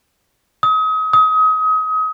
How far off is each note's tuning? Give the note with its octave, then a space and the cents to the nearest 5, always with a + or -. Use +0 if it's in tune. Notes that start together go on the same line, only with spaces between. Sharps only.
D#6 +35
D#6 +30